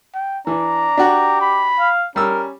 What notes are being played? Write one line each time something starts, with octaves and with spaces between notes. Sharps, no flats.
G5
E3 D4 A#5
D4 F#4 G4
B5
F5
G3 C#4 A#4 E6